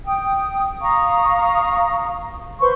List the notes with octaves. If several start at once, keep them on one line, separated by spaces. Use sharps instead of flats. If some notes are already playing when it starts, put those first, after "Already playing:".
G5 D#6
F5 A#5 C#6 D#6
B4 C5 C6 C#6